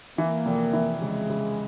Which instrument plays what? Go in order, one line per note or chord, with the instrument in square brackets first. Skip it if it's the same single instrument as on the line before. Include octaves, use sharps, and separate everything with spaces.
[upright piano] E3 [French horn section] A#3
[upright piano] F1
E3
[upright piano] C#3 [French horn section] G#3
[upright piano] C#3